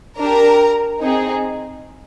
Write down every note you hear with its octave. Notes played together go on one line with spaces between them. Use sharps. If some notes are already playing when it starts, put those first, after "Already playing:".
D4 G4 A#4 A#5
C4 D#4 G#4